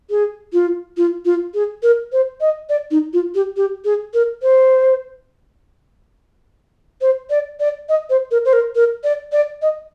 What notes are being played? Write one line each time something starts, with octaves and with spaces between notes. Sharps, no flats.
G#4
F4
F4
F4
G#4
A#4
C5
D#5
D5
D#4
F4
G4
G4
G#4
A#4
C5
C5
D5
D5
D#5
C5
A#4
C5
A#4
A#4
D5
D5
D#5